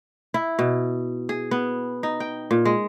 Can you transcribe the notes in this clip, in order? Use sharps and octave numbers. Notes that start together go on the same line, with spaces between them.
E4
B2
G#4
B3
D#4
G5
A#2
G#3